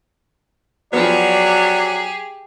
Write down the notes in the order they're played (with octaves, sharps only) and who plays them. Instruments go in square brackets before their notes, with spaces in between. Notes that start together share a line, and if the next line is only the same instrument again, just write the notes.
[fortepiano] F3 B3 [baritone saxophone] F#3 [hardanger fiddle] G4 G#4 [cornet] D5